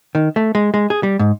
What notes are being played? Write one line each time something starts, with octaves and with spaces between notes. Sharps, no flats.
D#3
A3
G#3
G#3
G#4
G3
G#2